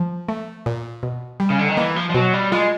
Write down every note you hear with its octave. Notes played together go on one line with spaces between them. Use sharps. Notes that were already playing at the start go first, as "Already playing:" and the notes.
Already playing: F3
A3
A#2
B2
G3
C#3
D3
D#3
E3 A#3
F3
F3
B2 F#3
G3
G#3 F4